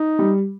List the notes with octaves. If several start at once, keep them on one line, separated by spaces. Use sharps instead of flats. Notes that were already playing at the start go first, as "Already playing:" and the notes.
Already playing: D#4
G3